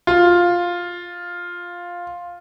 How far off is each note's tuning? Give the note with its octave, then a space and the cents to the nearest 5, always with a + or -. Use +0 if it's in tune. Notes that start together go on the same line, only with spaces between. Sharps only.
F4 +5